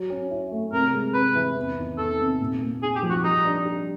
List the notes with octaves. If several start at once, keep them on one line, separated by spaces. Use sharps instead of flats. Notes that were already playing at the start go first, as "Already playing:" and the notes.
Already playing: F#3
C#4
E4
A3
C3 A#4
G#3
C3 B4
E3
E2
D#3
E2 A4
C3
A#2
A#3
D#4 G#4
G4
F3
F#4
G3 D#4
D4
G3